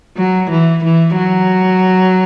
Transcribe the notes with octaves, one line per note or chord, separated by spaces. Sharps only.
F#3
E3
E3
F#3